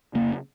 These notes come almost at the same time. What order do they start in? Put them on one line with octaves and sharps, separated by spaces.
F2 C#3 A#3 F1